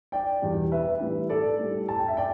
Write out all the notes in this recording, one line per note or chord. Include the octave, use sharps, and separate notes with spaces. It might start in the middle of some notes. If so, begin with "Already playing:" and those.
D5 G5
E2 B2 G3
B4 E5
A2 E3 G3
A4 D5
A2 G3
A5
G5
E5
D5 G5